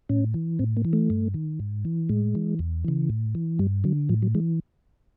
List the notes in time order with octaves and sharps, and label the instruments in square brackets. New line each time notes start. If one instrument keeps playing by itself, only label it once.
[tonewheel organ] A2 C#4
E3
A2 C4
A#3
E3
A3
G2
D#3
G#2
E3
A2 G#3
E3
E2
C#3 E3
A2
E3
G2 G3
D3 F#3
A2 F3
F#3
E3 G#3